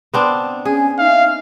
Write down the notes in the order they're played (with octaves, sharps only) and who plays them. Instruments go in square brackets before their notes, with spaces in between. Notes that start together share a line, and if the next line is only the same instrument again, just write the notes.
[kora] B3 C4 D4
[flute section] C#4 G#5 [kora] G#4
[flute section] D#4 E5 [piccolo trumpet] F5